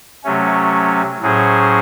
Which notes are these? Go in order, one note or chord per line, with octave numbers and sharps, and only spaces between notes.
C3 F#3 A3 C#4
A2 F#3 C#4 G#4 C5